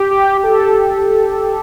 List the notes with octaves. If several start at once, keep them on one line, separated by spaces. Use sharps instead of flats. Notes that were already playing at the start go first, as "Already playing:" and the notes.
Already playing: G4
G4
G4
A4